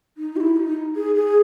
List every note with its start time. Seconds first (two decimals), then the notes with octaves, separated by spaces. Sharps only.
0.18 D#4
0.37 G4
0.40 E4
0.56 D#4
0.96 G#4
1.15 G#4